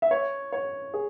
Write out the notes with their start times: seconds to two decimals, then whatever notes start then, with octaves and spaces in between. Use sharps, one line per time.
0.02 E5
0.11 C#5
0.52 C#5
0.94 G#4